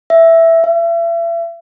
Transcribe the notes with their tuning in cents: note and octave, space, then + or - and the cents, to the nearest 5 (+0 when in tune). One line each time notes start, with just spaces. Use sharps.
E5 +0
E5 +35